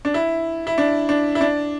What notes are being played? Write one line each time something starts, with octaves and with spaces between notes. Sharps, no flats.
D4
E4
E4
D4
D4
E4
D4